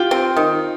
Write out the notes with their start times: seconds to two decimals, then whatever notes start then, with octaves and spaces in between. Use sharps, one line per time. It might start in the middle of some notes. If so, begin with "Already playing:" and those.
Already playing: F4 G4
0.11 C4
0.36 D#3